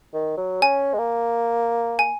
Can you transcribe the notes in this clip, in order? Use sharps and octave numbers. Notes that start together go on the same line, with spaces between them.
D#3
F#3
C#4 G#5
G#3
A#3
G#5